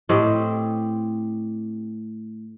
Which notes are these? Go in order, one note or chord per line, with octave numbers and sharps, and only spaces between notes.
A2 C4 G4 D#5